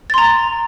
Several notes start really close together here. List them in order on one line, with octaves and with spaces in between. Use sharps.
A6 C6 A#5